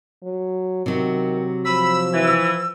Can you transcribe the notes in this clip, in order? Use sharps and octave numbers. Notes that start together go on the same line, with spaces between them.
F#3
C3 D#3 F#3
F3 B5 E6
E3